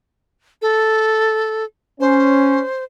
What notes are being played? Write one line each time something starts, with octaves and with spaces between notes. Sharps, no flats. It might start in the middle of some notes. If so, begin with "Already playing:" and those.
A4
C#4 C5